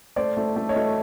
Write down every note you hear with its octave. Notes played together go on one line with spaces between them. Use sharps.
A3 C5 D5
A3
A3
C#5 D#5
A3